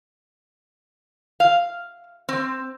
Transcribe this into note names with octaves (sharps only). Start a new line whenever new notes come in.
F5
C4